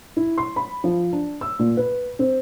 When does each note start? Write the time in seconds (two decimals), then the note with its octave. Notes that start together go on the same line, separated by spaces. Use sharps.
0.17 E4
0.38 C6
0.56 B5
0.84 F3
1.12 D4
1.41 E6
1.59 A#2
1.77 B4
2.19 C4